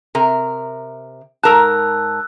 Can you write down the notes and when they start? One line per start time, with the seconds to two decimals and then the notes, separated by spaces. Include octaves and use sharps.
0.15 C3 A#4
1.44 G#2 A#4 A5 E6 F#6